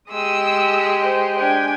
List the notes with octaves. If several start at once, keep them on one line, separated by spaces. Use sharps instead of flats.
G#3 G4 D#6 E6
C5
D4 G5 G#5